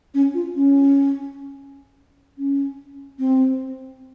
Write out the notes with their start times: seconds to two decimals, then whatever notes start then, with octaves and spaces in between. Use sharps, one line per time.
0.14 C#4
0.34 F4
0.55 C#4
2.38 C#4
3.19 C4